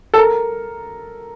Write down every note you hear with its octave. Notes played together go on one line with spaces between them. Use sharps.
A4
A#4